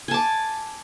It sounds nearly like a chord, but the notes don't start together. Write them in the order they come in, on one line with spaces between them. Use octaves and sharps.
G#5 A5 D6